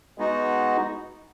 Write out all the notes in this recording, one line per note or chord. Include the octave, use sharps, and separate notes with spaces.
G#3 B3 D#4 F#4